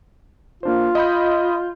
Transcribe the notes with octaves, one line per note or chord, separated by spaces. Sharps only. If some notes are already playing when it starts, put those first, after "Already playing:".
A#3 D4 F4 C5
D#5 B5 G6